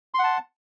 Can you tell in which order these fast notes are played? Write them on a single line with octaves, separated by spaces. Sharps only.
C6 F#5 A5